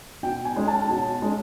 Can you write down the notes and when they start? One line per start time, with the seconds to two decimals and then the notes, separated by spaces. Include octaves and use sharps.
0.23 B2 G5
0.45 G#5
0.56 G#3 C#4
0.68 A5
0.89 B2
1.22 G#3 C#4